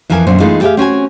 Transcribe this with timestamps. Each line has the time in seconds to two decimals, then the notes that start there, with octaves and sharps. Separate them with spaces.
0.10 F2 E3 F3 A#4 G#5
0.27 F#2 A#2 D3 C4 C5
0.40 E3 G#3 A3 B3 D#4 F4
0.62 G4 G#4 E5 F5
0.77 C4 C#4 F#4 G#5